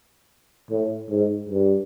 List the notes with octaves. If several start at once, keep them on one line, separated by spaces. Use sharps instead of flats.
A2
G#2
G2